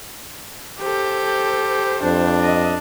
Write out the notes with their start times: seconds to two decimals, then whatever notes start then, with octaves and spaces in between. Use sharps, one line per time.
0.81 G4 A4 C5
2.04 F2 D4
2.41 D#5